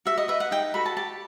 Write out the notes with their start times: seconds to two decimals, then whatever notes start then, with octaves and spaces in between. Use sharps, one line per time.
0.06 F#4 E5
0.18 D#5
0.28 B4 D#5 E5
0.40 F#5
0.51 D#4 G5
0.74 F#4 A4 B5
0.86 A5
0.97 G4 A5